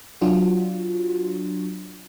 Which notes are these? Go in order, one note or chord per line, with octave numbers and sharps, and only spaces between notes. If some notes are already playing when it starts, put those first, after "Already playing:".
F#3 D4 F4 F#4